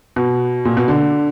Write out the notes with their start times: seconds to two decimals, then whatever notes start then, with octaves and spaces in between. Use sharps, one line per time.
0.16 B2
0.65 A#2
0.77 B2
0.88 D3